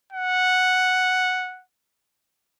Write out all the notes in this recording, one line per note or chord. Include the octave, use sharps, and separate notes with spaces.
F#5